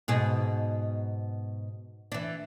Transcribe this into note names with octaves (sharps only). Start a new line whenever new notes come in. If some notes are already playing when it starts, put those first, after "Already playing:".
G#2 B2 G#4
E3 D4